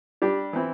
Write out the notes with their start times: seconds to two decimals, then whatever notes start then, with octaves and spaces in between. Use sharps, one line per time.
0.22 G3 D4 G4
0.53 E3 C4 E4